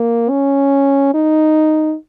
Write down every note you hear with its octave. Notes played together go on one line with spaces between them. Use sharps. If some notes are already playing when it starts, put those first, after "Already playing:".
Already playing: A#3
C#4
D#4